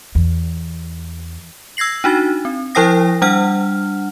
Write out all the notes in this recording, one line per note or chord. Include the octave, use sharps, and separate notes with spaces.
E2
E6 G#6 A#6 C7 F#7
D4 D#4 F#4 A6
C4
F3 E4 C5 G5 D#6 A#6
G3 D4 F#5 F6